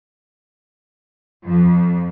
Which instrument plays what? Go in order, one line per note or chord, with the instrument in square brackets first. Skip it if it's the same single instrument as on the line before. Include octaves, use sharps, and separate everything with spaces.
[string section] F2